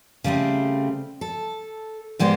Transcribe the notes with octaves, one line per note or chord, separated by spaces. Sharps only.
C#3 G3 A3 C4
A4
G#2 G3 G#3 B3 G#4 C5